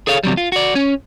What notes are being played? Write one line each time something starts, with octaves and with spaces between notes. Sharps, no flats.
G#4 A4 C#5 F5
E2 C3 E3 F#3 G3
F4
F#4 D5
C#4